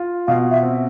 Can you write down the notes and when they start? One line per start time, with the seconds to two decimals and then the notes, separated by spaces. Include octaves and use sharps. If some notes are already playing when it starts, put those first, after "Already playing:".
Already playing: F4
0.27 B2 F5
0.51 E5
0.63 C4